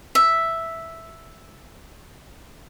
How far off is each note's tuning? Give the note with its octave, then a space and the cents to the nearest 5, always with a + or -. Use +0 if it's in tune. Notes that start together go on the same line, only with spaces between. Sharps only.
E5 +0